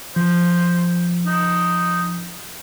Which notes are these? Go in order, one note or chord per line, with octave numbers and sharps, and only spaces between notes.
F3 C5
D#4